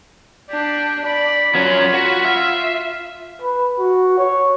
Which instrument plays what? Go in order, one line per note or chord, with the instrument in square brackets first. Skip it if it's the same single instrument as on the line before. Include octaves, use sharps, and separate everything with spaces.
[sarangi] D4 [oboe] G4
[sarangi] D5 [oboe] B5
[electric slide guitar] F#3 C#4 [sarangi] F4
[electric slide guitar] F#4
[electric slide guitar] E5 [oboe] F5
[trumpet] B4
F#4
C#5